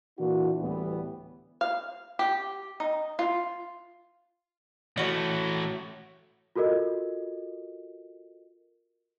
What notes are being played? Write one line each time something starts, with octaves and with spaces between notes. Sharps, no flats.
A#2 E3 D4 E4 F#4
D2 A2 E3 G3 B3
F5
G4
D#4
F4
E3 A3 C#4 F#4
F4 F#4 A4 A#4 D#5